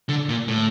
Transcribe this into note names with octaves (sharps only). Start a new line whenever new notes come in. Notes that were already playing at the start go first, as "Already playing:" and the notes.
D3
A#2
A2